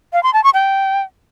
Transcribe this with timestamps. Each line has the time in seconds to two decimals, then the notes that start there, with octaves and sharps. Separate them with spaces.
0.13 F5
0.23 C6
0.33 A5
0.44 C#6
0.54 G5